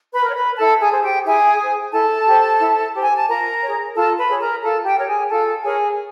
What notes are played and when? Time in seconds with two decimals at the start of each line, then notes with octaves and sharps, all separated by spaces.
0.12 B4 B5
0.25 A#4 C#5
0.35 B4 B5
0.57 E4 A4 A5
0.80 G#4 G#5
0.92 G#4 C5
1.02 G4 G5
1.25 E4 G#4 G#5
1.59 G#4 C5
1.93 E4 A4 A5
2.26 G4 C5
2.60 E4
2.94 G4 C5
3.03 G#5
3.16 A5
3.27 F4 A#4 A#5
3.61 C#5
3.67 G#4
3.95 F4 A4 A5
4.18 B4 B5
4.29 G#4 C#5
4.40 A#4 A#5
4.62 F4 A4 A5
4.85 G4 G5
4.96 A#4 C#5
5.07 G#4 G#5
5.30 F4 A4 A5
5.64 G#4 A#4 C#5 G#5